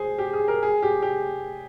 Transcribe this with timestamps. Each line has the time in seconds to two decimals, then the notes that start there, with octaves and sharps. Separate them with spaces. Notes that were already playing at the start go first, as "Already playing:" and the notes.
Already playing: G#4 C5
0.18 G4
0.33 G#4
0.48 A#4
0.63 G#4
0.82 G4
1.02 G4